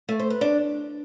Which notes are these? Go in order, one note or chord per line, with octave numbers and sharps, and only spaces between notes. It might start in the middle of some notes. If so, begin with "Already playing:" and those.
A3
C5
B4
D4